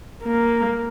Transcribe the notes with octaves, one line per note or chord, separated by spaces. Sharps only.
A#3